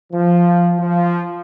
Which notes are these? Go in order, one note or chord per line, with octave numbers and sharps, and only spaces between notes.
F3
F3